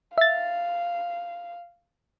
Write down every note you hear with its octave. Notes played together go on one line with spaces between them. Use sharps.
E5 F5 A6